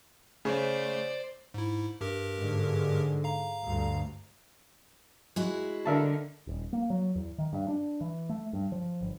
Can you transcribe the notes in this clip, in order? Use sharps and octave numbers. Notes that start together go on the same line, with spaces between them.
C#3 A3 C5 D5
G#2 E4
G2 G4 A#4
G#2 D3 G#3
F5 A#5
D2 G2
G#3 E4 F#4
D3 A#4 E5 A5
D#1
A#3
F#3
E2
D#3
G2
D4
E3
A3
G2
F3
G1